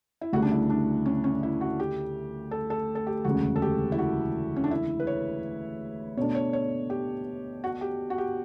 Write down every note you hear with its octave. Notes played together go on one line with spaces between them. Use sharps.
E4
D2 C#3 G3 F#4
D4
E4
D4
C#4
C#4
E4
F#4
G4
A4
A4
A4
G4
E1 D2 C#3 F#4
A4
G4
E4
F#4
C#4
D4
E4
B4
C#5
B2 A3 D4 C#5
C#5
C#5
G4
F#4
G4
F#4
G4